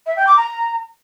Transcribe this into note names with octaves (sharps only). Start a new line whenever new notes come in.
E5
G5
D6
A#5